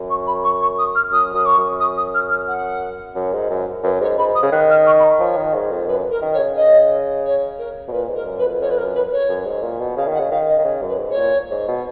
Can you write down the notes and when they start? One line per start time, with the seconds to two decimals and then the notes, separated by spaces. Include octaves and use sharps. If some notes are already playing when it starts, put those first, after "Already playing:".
Already playing: F#2
0.10 C#6
0.27 B5
0.44 C#6
0.61 C#6
0.78 D#6
0.95 F6
1.11 F#2 D#6
1.34 F#2 D#6
1.45 C#6
1.58 F#2
1.80 D#6
1.97 D#6
2.14 F6
2.30 F6
2.48 F#5
3.15 F#2
3.33 G#2
3.50 F#2
3.84 F#2 B4
4.01 G#2 C#5
4.18 G#2 B5
4.35 D#6
4.43 C#3
4.52 D#3 F#6
4.69 F6
4.86 C#6
4.99 B5
5.03 A#5
5.20 F3 C#5
5.37 D#3
5.55 G#2
5.71 F2
5.88 F#2 B4
6.11 A#4
6.22 D#3
6.33 C#5
6.39 C#3
6.57 D#5
7.25 C#5
7.58 A#4
7.88 B2
7.92 A#2 B4
8.09 G#2
8.15 A#4
8.26 F#2
8.38 B4
8.44 F2
8.61 F2 C#5
8.70 B4
8.77 A#4
8.83 F#2
8.95 B4
9.12 C#5
9.29 F#2
9.46 G#2
9.62 A#2
9.80 B2
9.97 C#3 F5
10.08 D#3
10.14 F#5
10.20 C#3
10.31 D#3 F5
10.48 D#5
10.59 D#3
10.65 C#3
10.83 F#2 B4
10.99 G#2
11.10 C#5
11.17 A#2
11.51 G#2
11.68 B2